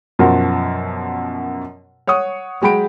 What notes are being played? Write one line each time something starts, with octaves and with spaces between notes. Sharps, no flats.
F#2 B2 F3 F#3 F#4 A#4
C#5 F#5 C#6 D#6
F#3 G#3 G5 B5 D7